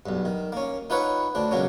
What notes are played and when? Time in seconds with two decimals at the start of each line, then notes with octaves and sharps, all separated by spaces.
0.06 B1 G2
0.25 D#3
0.52 A#3 C#4
0.90 D#4 F4 B4 C#5 F#5
1.35 D2 C4 D4
1.51 C#2 B2 F#3 A#3 C#4